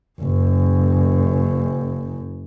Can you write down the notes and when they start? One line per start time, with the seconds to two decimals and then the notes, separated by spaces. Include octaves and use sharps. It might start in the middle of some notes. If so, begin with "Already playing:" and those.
0.20 F#1 F#2